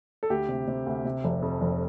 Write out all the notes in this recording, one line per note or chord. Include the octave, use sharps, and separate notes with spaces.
A4
D2 G4
C3
C3
D2
C3
F1
F2
F1